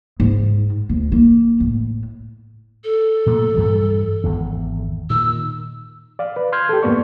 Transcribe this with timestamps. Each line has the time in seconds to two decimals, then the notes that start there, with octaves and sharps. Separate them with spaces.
0.20 G#2
0.89 D2
1.12 A#3
1.60 A2
2.84 A4
3.26 A#2 F#3 A3
3.55 G2 E3 G3
4.24 G#1 E2
5.10 A#2 D#3 E6
6.19 D5 F5
6.36 B4
6.52 C6 F6 G6 G#6
6.69 G4 A4
6.83 E2 G#2 A#3 B3 D5 C#6